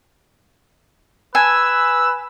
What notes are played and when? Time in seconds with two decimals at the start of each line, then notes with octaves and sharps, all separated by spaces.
1.35 B4 G#5 E6